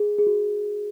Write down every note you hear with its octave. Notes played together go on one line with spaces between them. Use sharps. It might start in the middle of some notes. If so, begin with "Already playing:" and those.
Already playing: G#4
G#4
F#4